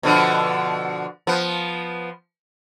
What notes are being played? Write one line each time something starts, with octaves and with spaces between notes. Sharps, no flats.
B2 D3 F3
F3 B3